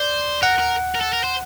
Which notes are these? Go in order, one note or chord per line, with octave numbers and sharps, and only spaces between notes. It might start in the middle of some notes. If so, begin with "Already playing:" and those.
Already playing: C5 D5
A#4 F#5
A#4
A#4
A4
A#4
C5